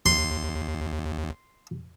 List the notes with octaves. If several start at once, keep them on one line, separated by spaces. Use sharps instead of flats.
D#2 C6